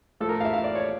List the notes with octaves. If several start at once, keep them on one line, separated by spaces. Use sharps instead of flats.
A2 F3 A3 A4
A#4
F5
E5
F5
D5
C#5